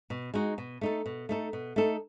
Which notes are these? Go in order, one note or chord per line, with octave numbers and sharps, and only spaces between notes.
B2
G#3 D#4 F#4
B2
A3 D#4 A4
B2
A3 D#4 A4
B2
A3 D#4 A4